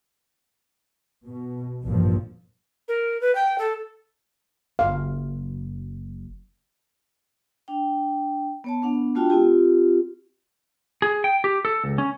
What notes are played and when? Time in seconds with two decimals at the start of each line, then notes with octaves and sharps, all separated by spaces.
1.26 B2
1.84 A1 D2 G2 A#2 F3
2.88 A#4
3.21 B4
3.35 G5
3.58 A4
4.79 F#1 F#2 F5
7.68 D4 G5
8.64 B3 C#5 A5
8.82 B3 D4 F#5
9.15 A3 D4 F4 F#4 G5 A5
9.30 C4 F4 G4
11.02 G#4
11.24 G5
11.44 G4
11.65 A4
11.84 C#2
11.98 C#4